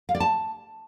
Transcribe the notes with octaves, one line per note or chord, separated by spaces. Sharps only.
F5
D5
A5